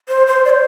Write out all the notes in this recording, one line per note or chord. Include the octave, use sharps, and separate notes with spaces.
C5
C5
D5
C5